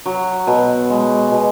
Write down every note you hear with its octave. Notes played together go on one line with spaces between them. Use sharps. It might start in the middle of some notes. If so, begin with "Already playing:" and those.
F#3
B2
G#3
B2